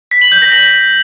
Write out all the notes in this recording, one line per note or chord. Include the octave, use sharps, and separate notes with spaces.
B6
F#7
G6
A#6
F#7